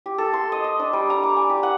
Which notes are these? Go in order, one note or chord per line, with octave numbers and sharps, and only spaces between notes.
G4
A4
C6
D#5
D#5
D4
G3
A#5
D6
G#5
G4
F#5